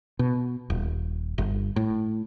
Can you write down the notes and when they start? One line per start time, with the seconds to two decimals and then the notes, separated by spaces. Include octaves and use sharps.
0.19 B2
0.70 D#1
1.38 G1
1.76 A2